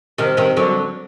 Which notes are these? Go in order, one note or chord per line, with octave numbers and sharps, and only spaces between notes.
C3 D#3
C3 D#3
D3 F#3